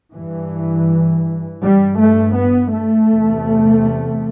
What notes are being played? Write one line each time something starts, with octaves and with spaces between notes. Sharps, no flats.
G2 E3
G2 G3
A3
B3
A3
E2 C3